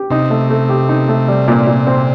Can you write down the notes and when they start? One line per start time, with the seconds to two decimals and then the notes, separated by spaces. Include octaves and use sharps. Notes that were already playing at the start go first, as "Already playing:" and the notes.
Already playing: G4
0.10 C3 D#4
0.30 A3
0.50 A3
0.69 G4
0.89 D#4
1.08 A3
1.28 G3
1.48 A#2
1.67 A#2
1.87 C4